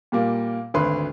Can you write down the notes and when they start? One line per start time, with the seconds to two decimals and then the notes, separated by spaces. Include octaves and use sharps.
0.12 A#2 G3 A#3
0.74 G#1 D2 B4 C6